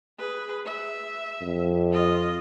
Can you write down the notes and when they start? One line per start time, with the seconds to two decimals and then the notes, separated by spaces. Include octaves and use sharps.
0.18 G#4 B4
0.65 E5
1.41 F2
1.92 F4 D#5